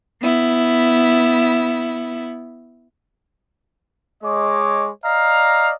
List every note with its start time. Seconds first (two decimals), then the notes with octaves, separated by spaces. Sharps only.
0.22 B3 E4
4.23 G#3 C#5 D#5 D6
5.05 D5 D#5 F5 A#5